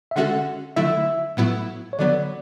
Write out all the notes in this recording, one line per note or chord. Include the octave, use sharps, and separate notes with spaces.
E5
D3 G#3 C#4 F#4 A4 F#5
D3 F#3 A3 E4 E5
A2 F#3 B3 E4
C#5
D3 F#3 B3 D5